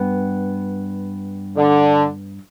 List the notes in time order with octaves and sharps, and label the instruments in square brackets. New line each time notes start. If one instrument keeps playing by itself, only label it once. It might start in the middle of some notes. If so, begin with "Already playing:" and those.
Already playing: [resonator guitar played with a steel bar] G2 B3
[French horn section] D3